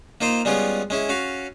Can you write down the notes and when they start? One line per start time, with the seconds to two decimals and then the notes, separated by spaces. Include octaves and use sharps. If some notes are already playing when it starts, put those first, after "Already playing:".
0.21 A#3 D#4 F4 C5
0.45 G3 G#3 B3 C#4 F4
0.90 G#3 C#4 E4
1.09 C#4 F#4 F5